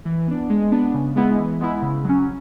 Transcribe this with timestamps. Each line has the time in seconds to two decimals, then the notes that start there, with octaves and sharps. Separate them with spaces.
0.05 E3
0.28 B3 D4
0.50 G#3
0.72 B3 D4
0.94 C#3
1.16 G#3 B3 E4
1.38 E3
1.61 G#3 B3 E4
1.82 C#3
2.04 F#3 C#4